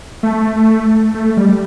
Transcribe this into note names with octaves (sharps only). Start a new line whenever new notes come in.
A3
A3
G3